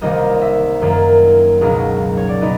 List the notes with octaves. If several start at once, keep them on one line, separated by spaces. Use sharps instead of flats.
C2 C3 D#3 G3 A#3 D#5
D#5
E5
F#2 D#3 F#3 A#3
C#2 B2 F#3 A#3 D#4 D#5
C#5
D5
B2 B3 D#4 D#5